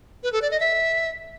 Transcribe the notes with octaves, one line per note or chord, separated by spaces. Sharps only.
B4
A4
D5
D#5
E5